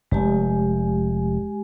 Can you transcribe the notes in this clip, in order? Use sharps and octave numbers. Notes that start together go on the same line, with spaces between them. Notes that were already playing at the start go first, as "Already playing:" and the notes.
F1 G#3 G4 G#5